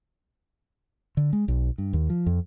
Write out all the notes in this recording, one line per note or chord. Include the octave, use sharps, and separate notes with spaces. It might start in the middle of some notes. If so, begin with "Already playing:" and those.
D3
G#3
B1
G2
D#2
F3
F2